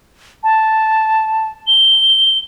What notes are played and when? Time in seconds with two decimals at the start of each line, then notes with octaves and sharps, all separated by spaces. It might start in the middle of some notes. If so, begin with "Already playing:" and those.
0.44 A5
1.67 G7